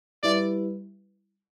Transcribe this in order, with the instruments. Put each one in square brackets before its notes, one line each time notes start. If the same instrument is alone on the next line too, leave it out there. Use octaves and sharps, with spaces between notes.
[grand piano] G3 E4 B4 E5 [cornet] D5